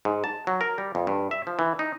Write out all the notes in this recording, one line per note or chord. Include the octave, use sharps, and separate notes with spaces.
G#2
A5
F#3
A#4
G3
F2
G2
E5
F3
E3
D#4